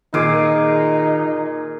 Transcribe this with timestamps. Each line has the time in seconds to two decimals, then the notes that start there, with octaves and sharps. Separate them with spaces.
0.14 A#2 D#3 D#4 G#4 D6